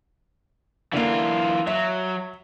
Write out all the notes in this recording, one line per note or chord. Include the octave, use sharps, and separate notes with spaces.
D3 E3 A#3 F4
F#3 E5